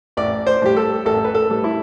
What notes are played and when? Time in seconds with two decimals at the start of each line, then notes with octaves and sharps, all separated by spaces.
0.17 A1 D5
0.47 C5
0.62 A2 G3 G4
0.76 A4
1.05 A1 A4
1.25 B4
1.35 A4
1.49 A2 G3
1.64 E4